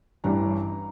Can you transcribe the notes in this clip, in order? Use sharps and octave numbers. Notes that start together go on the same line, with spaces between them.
A1 G2 E3 G3 A#5